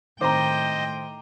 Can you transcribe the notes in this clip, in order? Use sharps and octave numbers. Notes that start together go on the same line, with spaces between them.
A2 D#3 C4 C5 D#5 G5 A#5 D6